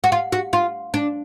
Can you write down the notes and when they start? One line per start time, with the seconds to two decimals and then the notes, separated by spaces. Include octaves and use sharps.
0.04 F#4
0.12 F4
0.32 F#4
0.53 F4
0.94 D4